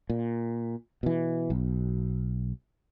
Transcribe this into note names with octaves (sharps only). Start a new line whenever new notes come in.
A#2
B2 E3
B1